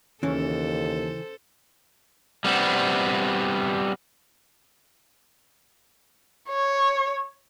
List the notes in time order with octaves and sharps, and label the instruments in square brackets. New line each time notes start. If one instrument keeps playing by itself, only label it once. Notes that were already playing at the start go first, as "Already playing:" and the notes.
[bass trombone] D#2 [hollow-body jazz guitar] C#3 E3 [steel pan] C#4 [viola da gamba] A4 C5
[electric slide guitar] G3 B3 C4
[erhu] C#5